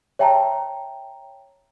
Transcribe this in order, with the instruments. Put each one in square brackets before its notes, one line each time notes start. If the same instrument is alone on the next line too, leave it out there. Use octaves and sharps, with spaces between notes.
[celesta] C#5 E5 G5 A5 A#5